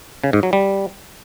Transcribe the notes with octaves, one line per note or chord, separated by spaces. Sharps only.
C#3
G#2
F#3
G3